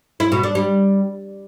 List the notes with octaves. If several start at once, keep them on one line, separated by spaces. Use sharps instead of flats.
E4
B2
D4
G3